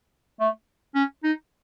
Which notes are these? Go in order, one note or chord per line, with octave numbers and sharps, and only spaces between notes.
A3
C#4
D#4